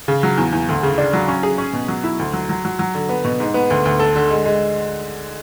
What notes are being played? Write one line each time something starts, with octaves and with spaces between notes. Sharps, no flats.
C#3
F#3
E2
E2
D2
C#3
D4
F#3
C#4
G#4
C#4
B2
F#3
E4
D2
F#3
F#3
F#3
F#3
D3
B3
B2
G#2
B3
D2
D2
A4
D3
G#3
G#3